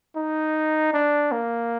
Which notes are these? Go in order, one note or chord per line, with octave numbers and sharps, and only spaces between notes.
D#4
D4
A#3